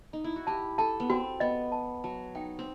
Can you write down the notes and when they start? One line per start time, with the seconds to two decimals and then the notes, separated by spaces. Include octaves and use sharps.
0.13 D#4
0.24 E4
0.36 F#4
0.47 G4 A5
0.78 A4 A5
1.00 B3
1.10 C4 F#4
1.40 B3 D#5
1.72 A5
2.04 F#3 A5
2.35 D#4 G5
2.59 C4